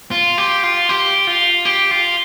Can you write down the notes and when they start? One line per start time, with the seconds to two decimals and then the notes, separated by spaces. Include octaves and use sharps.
0.11 F4
0.38 G4
0.63 F4
0.89 G4
1.27 F4
1.65 G4
1.91 F4